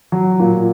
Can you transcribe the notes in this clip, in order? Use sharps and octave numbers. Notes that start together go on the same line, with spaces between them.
F#3
A#2